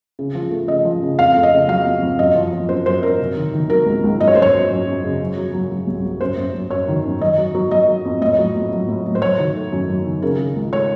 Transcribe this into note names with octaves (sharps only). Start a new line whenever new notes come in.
C#3
F3
A3
C#3 D#5
F3
C#3
F2 F5
A3
D#5
C#3
F#3 F5
F2
F2
F#2 D#5
F3
F3
F#2 C5
F#2 C5
F#2 A#4
C3
D#3
D#3
F#3 A#4
C#2
C#2
F#2 D#5
C#5
F#2 C5
C#5
F#2
F#2
F#2
C#3
F#3
F#3
F#3
F#3
C2
F#3
F#2 C5
F#2
F#2
F#2 C#5
D#3
F#2
F#3 D#5
F#3
F#3
F#3 D#5
F#3
F2
A2 D#5
F#3
A2
F#3
A2
F#3
C5
F#3 C#5
D#3
A3
F#2
F#3
D#3
C#3 A#4
C#3
C#2
A3 C#5